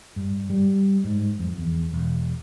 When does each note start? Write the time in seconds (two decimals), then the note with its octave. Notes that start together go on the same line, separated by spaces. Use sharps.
0.16 G2
0.50 G3
1.04 G#2
1.39 F2
1.58 E2
1.93 E1